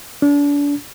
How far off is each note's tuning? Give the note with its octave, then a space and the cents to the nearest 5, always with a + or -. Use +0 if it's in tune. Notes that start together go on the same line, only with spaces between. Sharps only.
D4 -35